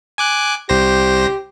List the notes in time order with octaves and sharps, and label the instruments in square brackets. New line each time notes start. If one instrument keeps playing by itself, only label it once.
[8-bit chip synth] G#5 D6 F#6
[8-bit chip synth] C2 C5 A#6 [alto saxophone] G4